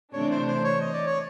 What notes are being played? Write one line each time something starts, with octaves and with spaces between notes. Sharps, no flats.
C3 E3 A3 D4 C#5
C5
C5
C#5
D#5
D5
C#5